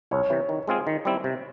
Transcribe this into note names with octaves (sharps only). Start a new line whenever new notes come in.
C2 C#5
C3 E3
D#3
G#3 C4 F4 G#4
D#3
G3 C4 E4
C3